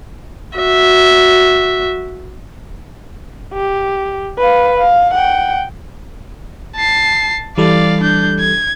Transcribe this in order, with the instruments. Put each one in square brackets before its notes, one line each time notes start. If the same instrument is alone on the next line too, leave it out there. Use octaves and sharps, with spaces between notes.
[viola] F#4 E5
[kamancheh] G4
B4 F5
F5
F#5 G5
[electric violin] A5 C7
[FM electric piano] E3 G3 A4 [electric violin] D5 F5
[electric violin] D4 G6
G#6